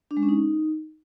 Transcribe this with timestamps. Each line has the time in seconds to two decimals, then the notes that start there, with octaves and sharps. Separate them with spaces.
0.11 D4
0.17 G#3
0.23 C#4
0.29 D#4